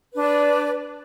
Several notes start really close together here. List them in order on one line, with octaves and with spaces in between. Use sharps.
B4 D4 D5